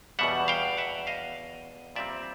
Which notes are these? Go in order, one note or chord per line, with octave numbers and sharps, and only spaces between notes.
E2 B2 G3 E5 F#5
F5 G5
E5 F#5
D#5 F5
A#2 G3 C4 D5 E5